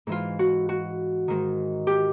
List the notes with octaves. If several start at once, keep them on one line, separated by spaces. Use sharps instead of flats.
G#2 E3 F4
F#4
F#4
G#2 D#3
G4